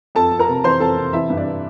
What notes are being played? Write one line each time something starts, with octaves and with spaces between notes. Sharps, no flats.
F2 A4 A5
F2
A#4 A#5
C3
E3 C5 C6
F2 A4 A5
C3
E3 E4 E5
G2
D4 D5